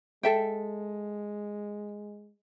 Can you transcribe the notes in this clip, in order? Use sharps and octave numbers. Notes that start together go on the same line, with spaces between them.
G#3 A4 E5 G5